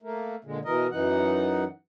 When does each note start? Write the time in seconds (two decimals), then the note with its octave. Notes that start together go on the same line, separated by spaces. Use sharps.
0.02 A3 A#3
0.44 A#2 D3 G#3
0.65 B2 E3 A#4 D#5
0.91 F#2 E3 D#4 F#5